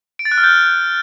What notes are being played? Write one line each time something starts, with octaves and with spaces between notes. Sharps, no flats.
D7
A6
F#6
F6
G6